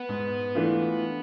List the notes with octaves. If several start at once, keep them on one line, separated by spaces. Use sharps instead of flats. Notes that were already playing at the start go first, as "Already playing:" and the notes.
Already playing: B3
G#2
E3 A3 D4 F4